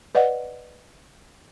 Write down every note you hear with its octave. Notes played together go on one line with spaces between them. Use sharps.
B4 D5 D#5 F#5